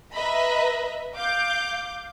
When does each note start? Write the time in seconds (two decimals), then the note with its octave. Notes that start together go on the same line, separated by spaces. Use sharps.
0.13 B4 D#5 E5 A#5 B5
1.16 F5 D6 G6